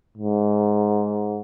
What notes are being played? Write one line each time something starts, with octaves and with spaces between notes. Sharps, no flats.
G#2